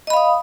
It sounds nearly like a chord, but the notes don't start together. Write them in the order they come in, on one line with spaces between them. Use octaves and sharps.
D#5 B5 F5 D#6